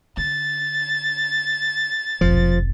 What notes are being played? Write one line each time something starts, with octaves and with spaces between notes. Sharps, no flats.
D3 A6
F1 B1 F3